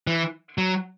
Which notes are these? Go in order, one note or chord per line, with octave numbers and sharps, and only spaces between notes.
E3
F#3